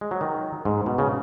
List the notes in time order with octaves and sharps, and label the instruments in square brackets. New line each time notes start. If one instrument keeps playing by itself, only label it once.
[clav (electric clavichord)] G#3
F#3
D#3
G#2
B2
C#3